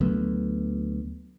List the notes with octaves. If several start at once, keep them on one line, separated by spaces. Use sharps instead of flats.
D2 F#3 A3 B3